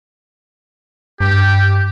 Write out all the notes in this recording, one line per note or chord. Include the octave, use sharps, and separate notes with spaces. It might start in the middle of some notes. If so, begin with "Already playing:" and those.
G2 G4